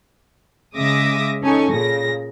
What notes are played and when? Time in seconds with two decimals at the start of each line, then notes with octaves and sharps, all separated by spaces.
0.76 C#3 G#3 E5 D6 D#6 A#6
1.43 C#4 D#4 A4 G#5 C#6
1.71 A#2 C#3 A#6